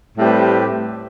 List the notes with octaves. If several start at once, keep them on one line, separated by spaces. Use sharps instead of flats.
A2 G3 C4 G4 B4